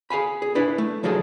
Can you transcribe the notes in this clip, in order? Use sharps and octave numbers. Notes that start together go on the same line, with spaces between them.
G#4 F5 G#5 B5
G#4
D4 E4 B4 E5
A3
C#3 F3 F#3 D#4 G#4 A4